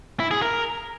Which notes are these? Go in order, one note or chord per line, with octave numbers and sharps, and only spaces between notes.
E4
G#4
A#4